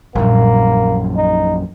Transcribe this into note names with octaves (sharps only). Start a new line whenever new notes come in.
A#1 F#2 A#2 G3 A#3
D#4